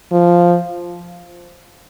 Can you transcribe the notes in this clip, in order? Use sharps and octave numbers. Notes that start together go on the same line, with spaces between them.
F3